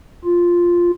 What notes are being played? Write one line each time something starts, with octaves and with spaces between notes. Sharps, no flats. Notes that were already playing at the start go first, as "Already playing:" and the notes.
F4